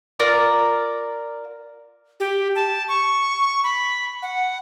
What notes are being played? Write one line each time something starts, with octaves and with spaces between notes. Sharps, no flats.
F4 A#4 D5
G4
A5
C#6
B5
F#5